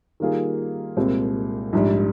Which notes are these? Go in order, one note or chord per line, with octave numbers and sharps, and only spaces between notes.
D#3 G3 A#3 F4 G#4
C2 A#2 G#3 C4 G4
A#1 G#2 G3